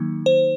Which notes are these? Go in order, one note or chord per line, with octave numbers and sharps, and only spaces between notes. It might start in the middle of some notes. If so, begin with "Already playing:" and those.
Already playing: D#3 F#3 A#3 D#4
C5